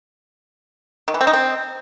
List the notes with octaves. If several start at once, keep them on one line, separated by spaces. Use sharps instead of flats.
D#3
E3
C4
D#4
C4